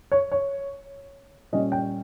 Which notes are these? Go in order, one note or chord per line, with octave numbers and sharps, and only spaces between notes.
C#5
C#5
A#2 G3 C#4 D#5
G5